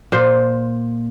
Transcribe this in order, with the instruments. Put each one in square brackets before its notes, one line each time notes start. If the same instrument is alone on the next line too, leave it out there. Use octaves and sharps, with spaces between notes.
[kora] A#2 C5